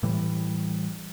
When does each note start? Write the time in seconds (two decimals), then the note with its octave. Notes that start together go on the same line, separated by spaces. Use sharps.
0.03 A2 E3 G3